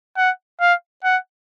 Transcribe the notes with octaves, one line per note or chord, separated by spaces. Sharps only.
F#5
F5
F#5